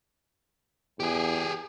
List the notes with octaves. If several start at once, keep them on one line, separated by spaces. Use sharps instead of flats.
E2 G4 G#4